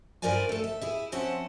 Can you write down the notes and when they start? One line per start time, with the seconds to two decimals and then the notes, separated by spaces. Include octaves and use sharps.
0.22 G2 F3 A#4 D5 F5 G#5
0.49 A3 A4
0.64 E5
0.81 E4 G#4 E5
1.12 F3 C4 C#4 E5 F#5 A5